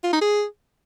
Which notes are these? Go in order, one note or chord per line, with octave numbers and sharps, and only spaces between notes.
F4
D#4
G#4